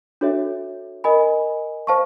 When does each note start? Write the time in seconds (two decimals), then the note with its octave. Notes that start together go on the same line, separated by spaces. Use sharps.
0.21 D4 F#4 A4 C#5 E5
1.04 A#4 D#5 G#5 B5
1.87 C5 F5 A5 C#6